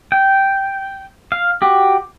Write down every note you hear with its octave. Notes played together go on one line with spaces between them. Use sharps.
G5
F5
F#4 G4